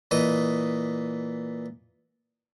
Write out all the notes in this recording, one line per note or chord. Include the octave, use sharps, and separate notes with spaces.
A#2 E3 D#5 D#6